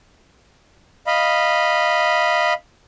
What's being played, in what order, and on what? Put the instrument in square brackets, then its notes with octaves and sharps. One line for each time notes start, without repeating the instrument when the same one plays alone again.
[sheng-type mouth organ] D#5 F5 B5